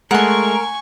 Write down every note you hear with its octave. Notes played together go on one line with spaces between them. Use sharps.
G#3 A3 A#4 F#5 G#5 C6 C#6